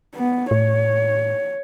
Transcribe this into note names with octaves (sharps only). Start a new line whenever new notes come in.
B3
A2 C#5